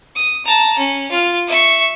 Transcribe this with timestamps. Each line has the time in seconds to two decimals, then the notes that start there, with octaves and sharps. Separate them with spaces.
0.15 D#6
0.46 A5 A#5
0.78 C#4
1.11 F4 F6
1.48 E5 C#6